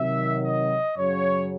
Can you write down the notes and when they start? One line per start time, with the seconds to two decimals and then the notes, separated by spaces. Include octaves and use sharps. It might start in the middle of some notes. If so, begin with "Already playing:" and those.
Already playing: C3 D#3 F#3 E5
0.43 D#5
0.97 F#2 C#3 F#3 C#5